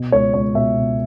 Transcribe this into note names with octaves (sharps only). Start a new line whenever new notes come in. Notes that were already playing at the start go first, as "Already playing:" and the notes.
Already playing: B2
C#2 C#5
C#2 C#5
B2 E5
B2